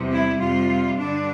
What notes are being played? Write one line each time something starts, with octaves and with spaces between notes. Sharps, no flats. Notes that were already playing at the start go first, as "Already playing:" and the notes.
Already playing: E2 C3 G3
E4
F2 C3 G3 F4
G2 D3 G3 D4